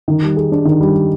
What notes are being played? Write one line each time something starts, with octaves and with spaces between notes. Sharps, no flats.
D#3
G3
G#4
D4
D#3
G3